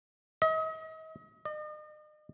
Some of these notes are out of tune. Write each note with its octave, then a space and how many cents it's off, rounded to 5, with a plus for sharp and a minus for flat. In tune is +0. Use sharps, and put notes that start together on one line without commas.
D#5 +40
D#5 -40